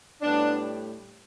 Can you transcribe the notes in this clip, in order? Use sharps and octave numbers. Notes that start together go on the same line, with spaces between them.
A2 G3 B3 D4